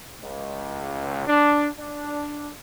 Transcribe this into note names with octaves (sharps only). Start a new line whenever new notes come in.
C#2
D4
D4